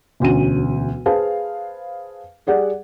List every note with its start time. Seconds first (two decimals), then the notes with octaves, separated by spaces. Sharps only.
0.20 E1 D2 C#4 D#7
1.06 G#4 B4 C5 F5 A5
2.47 G3 G#4 D5 F#5